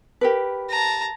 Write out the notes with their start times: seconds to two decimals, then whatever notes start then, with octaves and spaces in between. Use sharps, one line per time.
0.21 G4 A#4 B4
0.70 A5 A#5